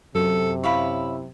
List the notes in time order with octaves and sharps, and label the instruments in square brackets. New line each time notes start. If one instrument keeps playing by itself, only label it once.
[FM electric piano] F#2 [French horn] C3 [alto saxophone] A4
[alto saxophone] E4 [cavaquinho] C#5 F5 B5